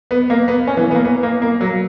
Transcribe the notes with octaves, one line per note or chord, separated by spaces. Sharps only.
B3
A#3
B3
C#4
E3
B3
A#3
B3
A#3
A#3
F#3